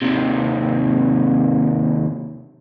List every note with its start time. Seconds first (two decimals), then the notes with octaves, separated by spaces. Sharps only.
0.02 D#2 C3